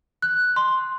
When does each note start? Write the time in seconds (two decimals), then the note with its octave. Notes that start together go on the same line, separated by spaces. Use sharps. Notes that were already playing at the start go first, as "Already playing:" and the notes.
0.22 F#6
0.56 C6